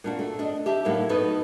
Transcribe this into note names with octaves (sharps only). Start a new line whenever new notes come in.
A#2 D4 F#4
A3
D4 D#5
G4 E5 A5
A2 F#3 A#3 D#4 E5
B3 D#4 F#4 A4 B4